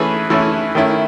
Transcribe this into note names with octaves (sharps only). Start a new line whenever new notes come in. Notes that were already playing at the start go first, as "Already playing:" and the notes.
Already playing: E3 A3 C#4 E4 G#4 B4
E3 A3 C#4 E4
D#3 A3 C#4 E4